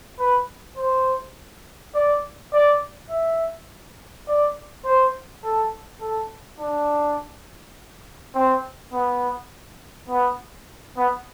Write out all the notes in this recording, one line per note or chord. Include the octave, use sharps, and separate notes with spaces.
B4
C5
D5
D5
E5
D5
C5
A4
A4
D4
C4
B3
B3
B3